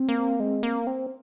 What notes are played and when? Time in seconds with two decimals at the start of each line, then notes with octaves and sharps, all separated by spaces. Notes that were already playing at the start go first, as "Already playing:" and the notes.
Already playing: C4
0.09 A#3
0.40 G#3
0.63 A#3
0.87 C4